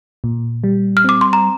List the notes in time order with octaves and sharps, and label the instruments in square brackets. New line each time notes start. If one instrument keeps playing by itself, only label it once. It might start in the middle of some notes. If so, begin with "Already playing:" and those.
[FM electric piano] A#2
G3
[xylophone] F6
[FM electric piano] C4 [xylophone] D6
[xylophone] C6
A#5